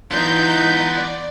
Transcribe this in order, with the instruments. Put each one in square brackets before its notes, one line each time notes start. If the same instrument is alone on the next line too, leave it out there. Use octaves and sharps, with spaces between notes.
[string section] E3 D#4 G6 [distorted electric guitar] B3 F4
[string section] D5